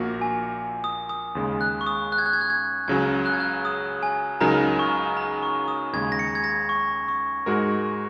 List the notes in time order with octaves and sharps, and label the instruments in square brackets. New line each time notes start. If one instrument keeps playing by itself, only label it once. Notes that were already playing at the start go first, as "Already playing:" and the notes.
Already playing: [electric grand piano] A#1 A#2 A#3 F#4 A#4
[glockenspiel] G#5
D#6
D#6
[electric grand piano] D#2 C#3 G#3
[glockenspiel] F#6
C#6
D#6
F#6
G#6
F#6
G#6
F#6
G#6
[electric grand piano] C#2 C#3 F#3 C#4 [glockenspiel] G#6
[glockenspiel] F#6
G#6
F#6
D#6
G#5
[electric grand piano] C#2 C#3 F#3 D#4 A#4 [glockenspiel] A#5
[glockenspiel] C#6
A#5
C#6
D#6
[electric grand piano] D#2 C#3 G#3 [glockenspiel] G#6
[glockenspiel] A#6
C#7
G#6
A#6
C#6
C#6
[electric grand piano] G#2 G#3 F#4 A#4